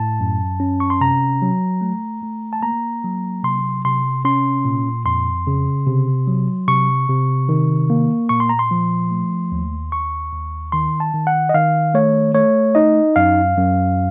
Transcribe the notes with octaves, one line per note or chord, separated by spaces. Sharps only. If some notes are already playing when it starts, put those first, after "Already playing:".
Already playing: A2 A5
F#2
C#4
C#6
C6
C3 A#5
F#3
A3
A3
A5
A#3 A#5
F#3
C3 C6
C3 C6
C#4 C6
A#2
F2 C6
C#3
C3
F#3
C3 C#6
C3
D#3
A#3
A#2 C#6
C6
A#5
C6
F3
A3
D#2
D#2 C#6
D#2
D#3 C6
A5
D#3
F#5
D#5
D#3 F5
A3 C#5
A3 C#5
D#4 D#5
F#2 F5
F#2